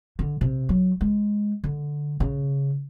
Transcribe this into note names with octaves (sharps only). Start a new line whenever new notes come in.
D3
C3
F#3
G#3
D3
C#3